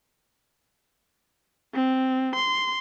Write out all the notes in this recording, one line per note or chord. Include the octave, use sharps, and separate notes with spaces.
C4
C6